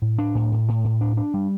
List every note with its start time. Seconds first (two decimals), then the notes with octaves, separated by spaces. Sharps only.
0.02 A2
0.19 D4
0.35 A2
0.52 A2
0.68 A2
0.84 A2
1.01 D4
1.17 D4
1.34 G3